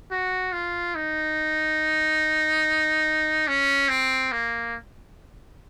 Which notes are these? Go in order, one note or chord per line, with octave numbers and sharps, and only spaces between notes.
F#4
F4
D#4
C#4
C4
A#3